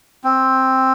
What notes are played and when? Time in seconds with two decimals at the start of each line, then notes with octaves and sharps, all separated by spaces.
0.24 C4